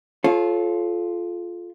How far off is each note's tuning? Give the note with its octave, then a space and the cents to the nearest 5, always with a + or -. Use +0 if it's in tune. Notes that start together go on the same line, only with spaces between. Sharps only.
F4 +0 A4 -30 C#5 -30